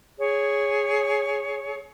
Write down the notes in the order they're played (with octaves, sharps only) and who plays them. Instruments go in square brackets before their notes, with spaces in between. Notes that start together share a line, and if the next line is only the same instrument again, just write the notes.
[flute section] G#4 C#5